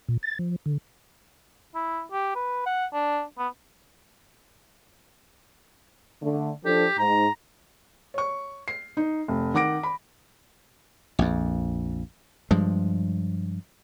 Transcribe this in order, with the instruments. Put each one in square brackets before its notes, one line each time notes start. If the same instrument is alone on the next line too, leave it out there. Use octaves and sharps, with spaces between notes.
[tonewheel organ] A#2
A6
F3
D3
[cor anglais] E4
G4
B4
F#5
D4
B3
[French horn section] D3 A3
[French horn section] F3 D4 A4 [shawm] G4
[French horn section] G#2 [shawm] A#5
[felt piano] C#5 C#6
C7
D#4
F1
D#3 F#5 D6 A#6 D7
B5
[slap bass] A#1 F2
G2 F3 G#3